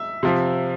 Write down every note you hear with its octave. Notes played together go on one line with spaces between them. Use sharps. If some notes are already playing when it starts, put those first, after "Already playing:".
Already playing: E5
C3 F3